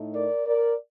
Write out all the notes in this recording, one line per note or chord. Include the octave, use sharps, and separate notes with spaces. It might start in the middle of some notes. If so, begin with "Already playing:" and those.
Already playing: A2 A3 D#4
A#4 D5
A#4 D5